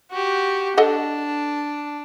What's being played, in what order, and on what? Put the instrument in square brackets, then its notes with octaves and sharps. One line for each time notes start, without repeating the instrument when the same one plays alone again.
[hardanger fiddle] F#4 G4
[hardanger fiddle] D4 [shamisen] A4 D#5 F#5